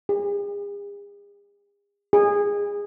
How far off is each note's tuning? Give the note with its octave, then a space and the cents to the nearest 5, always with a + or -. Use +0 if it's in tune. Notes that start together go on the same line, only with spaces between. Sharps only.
G#4 -40
G#4 -20